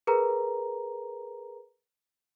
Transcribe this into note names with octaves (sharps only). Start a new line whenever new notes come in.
G#4 A#4 B4 A#5